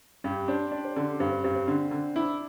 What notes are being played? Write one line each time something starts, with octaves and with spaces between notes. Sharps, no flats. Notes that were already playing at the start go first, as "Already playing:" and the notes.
G2 G4
D4 C5
D4 D5
C5
D3 A4
D4
G2 C4
C4
G2 C4
C4
D3
D3
D4 E4